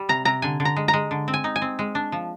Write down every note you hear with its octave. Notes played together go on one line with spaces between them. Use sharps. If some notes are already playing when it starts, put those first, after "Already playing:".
Already playing: G3
C3 A#5
C3 A#5
D3 G#5
D3
A#5
G#3
A#5
G#3
D3
C4
G#5
D#4
G#5
C4
G#3
D4
F3